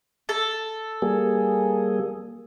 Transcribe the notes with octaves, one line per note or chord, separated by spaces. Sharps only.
A4
G3 A#3 G#4